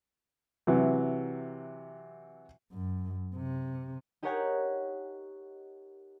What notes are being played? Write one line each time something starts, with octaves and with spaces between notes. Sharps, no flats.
C3 E3 F#3
F#2
C3
D#4 G4 A#4 C#5 F#5 G#5